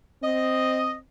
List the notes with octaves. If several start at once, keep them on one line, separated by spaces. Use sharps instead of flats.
C4 D#5